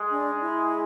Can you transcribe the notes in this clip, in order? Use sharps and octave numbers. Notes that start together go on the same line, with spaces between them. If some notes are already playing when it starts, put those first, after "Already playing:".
Already playing: G#3
D4
E4